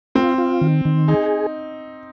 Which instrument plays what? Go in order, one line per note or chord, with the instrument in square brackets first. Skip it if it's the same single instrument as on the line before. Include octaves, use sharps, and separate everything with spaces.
[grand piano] C4 [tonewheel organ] F4
[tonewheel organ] F4
D#3
D#3
[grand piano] D#4 [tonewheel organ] G#4